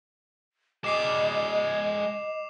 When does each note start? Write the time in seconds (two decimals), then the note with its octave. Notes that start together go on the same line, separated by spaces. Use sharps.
0.84 G#3 D5 D#5 D6 C7 E7